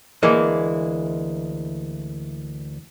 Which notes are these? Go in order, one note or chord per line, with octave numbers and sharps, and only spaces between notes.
D2 E3 G#3 A#3